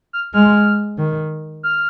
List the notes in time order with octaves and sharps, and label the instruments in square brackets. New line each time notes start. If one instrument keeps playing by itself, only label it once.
[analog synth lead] F6
[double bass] G#3 [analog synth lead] F6
[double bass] D#3
[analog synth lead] F6